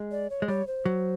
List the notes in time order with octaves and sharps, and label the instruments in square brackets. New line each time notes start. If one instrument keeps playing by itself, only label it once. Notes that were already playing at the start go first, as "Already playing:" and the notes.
Already playing: [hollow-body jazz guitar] G#3
[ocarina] D5
C#5
[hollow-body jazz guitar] G#3
[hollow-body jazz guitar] G3 [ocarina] C#5
[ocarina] C5
[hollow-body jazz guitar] F#3